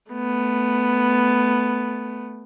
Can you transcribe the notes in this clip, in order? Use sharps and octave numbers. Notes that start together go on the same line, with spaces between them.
A3 B3